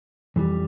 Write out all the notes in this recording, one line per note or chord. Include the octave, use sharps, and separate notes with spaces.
F2 E3 G3